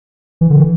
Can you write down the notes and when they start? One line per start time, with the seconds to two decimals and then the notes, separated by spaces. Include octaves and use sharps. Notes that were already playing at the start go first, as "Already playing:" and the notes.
0.41 E3
0.50 D3
0.58 E3